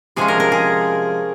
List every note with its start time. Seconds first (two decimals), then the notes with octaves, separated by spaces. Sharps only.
0.16 C3 F3 G#3 C#4 G#4
0.28 A#4
0.40 A#4
0.52 G#4